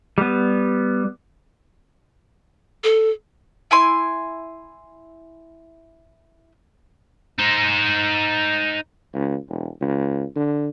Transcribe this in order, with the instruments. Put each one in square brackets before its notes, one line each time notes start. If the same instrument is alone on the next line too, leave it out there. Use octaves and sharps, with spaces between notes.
[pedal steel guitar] G3 B3
[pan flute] A4
[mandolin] E4 G#5 C6
[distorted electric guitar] D#4 C5
[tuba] C#2
E1
C#2
D3